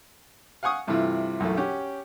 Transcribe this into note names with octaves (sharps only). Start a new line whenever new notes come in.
F5 F#5 G#5 C#6 D#6
G2 C3 E3 A3 E4 F4
B1 F#2 E3 A3
C#4 G4 F#5